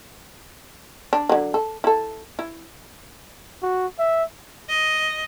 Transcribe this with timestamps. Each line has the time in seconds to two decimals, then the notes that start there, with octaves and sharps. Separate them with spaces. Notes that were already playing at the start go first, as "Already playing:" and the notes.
1.13 D4
1.29 D3 F#3
1.54 A4
1.84 E4 A4
2.39 E4
3.62 F#4
3.99 E5
4.69 D#5